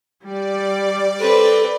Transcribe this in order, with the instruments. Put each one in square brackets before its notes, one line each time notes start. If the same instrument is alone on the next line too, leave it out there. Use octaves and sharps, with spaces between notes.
[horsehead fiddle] G3 [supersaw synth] D5
[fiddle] C4 B4 [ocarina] A4